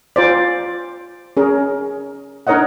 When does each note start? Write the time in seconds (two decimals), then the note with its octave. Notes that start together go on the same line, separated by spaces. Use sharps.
0.16 F4 C5 D5
1.37 C#4 G#4 A#4
2.47 D4 D#4 A#4 C#5 D#5 F#5